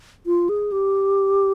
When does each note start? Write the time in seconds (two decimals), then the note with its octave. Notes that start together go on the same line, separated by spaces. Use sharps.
0.26 F4
0.49 G#4
0.72 G4